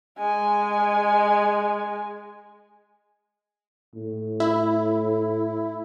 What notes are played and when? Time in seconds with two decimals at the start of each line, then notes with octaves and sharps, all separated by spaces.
0.18 G#3 G#5
3.94 A2
4.40 E4